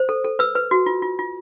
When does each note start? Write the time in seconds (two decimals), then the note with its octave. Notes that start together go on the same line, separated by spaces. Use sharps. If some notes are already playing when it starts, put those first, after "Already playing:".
Already playing: C5
0.09 A4
0.25 A4
0.39 B4 E6
0.55 B4
0.71 F#4
0.86 F4
1.02 F4
1.19 F4